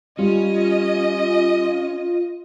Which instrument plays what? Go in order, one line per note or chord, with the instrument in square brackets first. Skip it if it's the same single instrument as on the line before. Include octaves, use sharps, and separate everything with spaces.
[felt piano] G3 [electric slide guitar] C#4 [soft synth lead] F4 [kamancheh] D#5